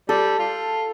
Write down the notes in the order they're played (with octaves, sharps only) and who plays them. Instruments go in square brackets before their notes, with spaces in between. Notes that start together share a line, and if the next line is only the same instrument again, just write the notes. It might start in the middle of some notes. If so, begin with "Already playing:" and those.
[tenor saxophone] G3 [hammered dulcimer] A4
[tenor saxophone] F4